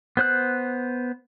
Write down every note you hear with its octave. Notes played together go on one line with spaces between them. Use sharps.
B3 C5 F#6